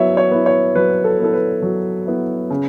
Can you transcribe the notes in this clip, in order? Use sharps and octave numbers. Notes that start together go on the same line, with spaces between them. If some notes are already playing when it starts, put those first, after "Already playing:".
Already playing: F#3 B3 E4 C#5 E5
C#5
B3 E4
C#5
F#3 B4
A4
B3 E4 A4
B4
F#3
B3 E4
C#3